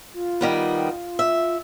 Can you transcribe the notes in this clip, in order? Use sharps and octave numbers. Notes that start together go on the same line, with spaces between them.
F4
D#3 G3 B3
E5